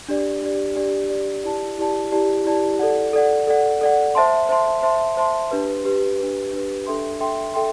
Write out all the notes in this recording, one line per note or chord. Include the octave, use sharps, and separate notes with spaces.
D4 G4 D5
D4 G4 D5
D4 G4 D5
D4 G4 D5
E4 G4 D5 A5
E4 G4 D5 A5
E4 G4 D5 A5
E4 G4 D5 A5
A4 D5 F#5
A4 D5 F#5
A4 D5 F#5
A4 D5 F#5
C5 E5 A5 C6
C5 E5 A5 C6
C5 E5 A5 C6
C5 E5 A5 C6
D4 G4 B4
D4 G4 B4
D4 G4 B4
D4 G4 B4
D4 A4 E5 G5 C6
D4 A4 E5 G5 C6
A4 E5 G5 C6